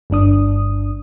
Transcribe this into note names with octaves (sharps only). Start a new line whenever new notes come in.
G1 G2 D4 D#6